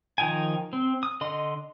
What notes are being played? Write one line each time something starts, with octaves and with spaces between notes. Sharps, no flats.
D#3 F3 D#4 G5 G#5
C4
D#6
D3 D#5 C6